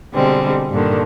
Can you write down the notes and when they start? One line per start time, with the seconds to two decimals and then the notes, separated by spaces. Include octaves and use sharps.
0.14 B2 D3 G3 G#3 C4
0.72 G2 A#2 D3 D#3